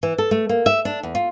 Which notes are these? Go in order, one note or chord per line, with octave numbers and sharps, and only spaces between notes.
E3
A4
A3
A#3
E5
D4
E2
F4